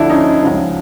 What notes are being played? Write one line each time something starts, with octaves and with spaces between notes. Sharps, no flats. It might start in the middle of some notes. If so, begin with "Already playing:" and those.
Already playing: D2 D3 F3 D4 E4
C#4 D#4
C#2 C#3 F3